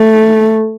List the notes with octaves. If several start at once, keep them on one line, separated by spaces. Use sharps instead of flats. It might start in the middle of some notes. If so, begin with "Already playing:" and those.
Already playing: A3